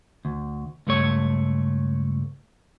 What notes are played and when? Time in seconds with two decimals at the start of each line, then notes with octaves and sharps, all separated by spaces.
0.25 D2
0.87 C#2 G2 A3 C#5